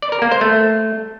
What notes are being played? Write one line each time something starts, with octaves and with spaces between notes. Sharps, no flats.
D5
A#4
A#3
C5
A3